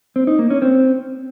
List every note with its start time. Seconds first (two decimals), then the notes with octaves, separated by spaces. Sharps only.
0.16 C4
0.27 D#4
0.39 A#3
0.50 C#4
0.62 C4